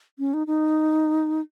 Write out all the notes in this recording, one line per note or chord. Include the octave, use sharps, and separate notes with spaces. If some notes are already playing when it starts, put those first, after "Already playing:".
C#4
D#4
D#4